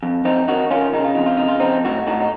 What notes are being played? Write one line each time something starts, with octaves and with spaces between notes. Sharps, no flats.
F2
F2 C4 D#4
D#3 D#4 F#4
D#3 C#4 F4
C#3 D#4
F4
F2 D#4
F4
C#3 D#4
F4
F2 C4 D#4
A2 D#4 F#4
A2 D#4 F#4
D#4